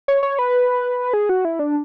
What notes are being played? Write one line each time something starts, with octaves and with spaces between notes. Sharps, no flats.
C#5
C#5
B4
G#4
F#4
E4
D4